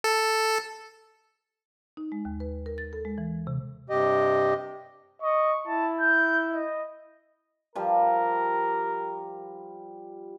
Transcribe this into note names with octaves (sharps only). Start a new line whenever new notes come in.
A4
D#4
G#3
D#2
B4
A#4
A6
A4
G#3
E3
C3
G2 C3 G4 D#5
D#5 C#6
E4 A5
G6
D#5
F3 G3 A#4